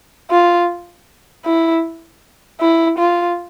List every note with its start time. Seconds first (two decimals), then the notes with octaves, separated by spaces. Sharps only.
0.31 F4
1.45 E4
2.61 E4
2.99 F4